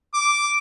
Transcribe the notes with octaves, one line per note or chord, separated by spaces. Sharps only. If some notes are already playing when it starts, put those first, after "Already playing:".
D6